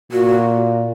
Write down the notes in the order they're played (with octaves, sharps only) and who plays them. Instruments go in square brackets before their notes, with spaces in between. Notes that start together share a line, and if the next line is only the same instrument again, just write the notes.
[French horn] A#2 [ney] F#4